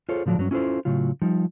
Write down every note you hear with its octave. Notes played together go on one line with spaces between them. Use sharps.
F4 G#4 A4 C5 C#5
A2 D3 F3 F#3 D4
G2 F#3 G#3 C#4
C#4 E4 F4 A4 C5
A2 C#3 F#3 F4
F3 G3 D#4